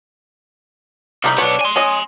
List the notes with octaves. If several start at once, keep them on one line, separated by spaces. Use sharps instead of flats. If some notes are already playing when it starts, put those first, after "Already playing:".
C2 G3 D#4 B5
B1 B3 D4 C#5
G#5 C6
C#4 D#5